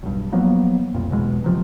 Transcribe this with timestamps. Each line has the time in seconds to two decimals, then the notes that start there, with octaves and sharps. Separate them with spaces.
0.03 B1 G2
0.32 F3 F#3 A#3 B3
0.94 C2 F2 A#2
1.10 B1 E2 B2 G#3
1.44 C3 F3 F#3